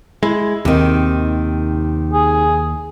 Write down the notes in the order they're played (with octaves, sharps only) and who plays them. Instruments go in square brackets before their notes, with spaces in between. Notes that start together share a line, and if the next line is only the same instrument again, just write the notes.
[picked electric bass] G#3 [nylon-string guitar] E4
[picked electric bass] D#2 [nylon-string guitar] C3 D#3
[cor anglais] G#4